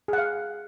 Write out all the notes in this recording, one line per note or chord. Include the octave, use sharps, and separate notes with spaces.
G#4 F5 F#5